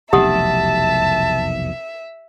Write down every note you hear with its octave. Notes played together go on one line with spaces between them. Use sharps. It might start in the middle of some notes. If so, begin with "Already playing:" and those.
F1 B1 E2 G4 E5 F#5 A5 D#6